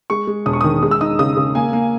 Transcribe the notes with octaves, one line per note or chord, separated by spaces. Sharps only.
G#3 C#6
G#3
E1 D#6
C#6
D#3 D#6
G#3 D#6
E6
D#4 D#6
C#3 D#6
C#3
A#3 G#5
A#3